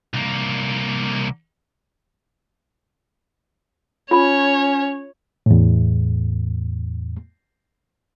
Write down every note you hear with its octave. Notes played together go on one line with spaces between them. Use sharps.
C2 A#3
C#4 F4 C#5 B5
E2 A2